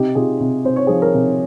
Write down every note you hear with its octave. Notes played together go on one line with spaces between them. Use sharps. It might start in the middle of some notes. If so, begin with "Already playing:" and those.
Already playing: C3 D#4 G4
C3 F4 G#4
C3
C3 C5
C#5
F3 G#4 C5
A#4 C#5
C3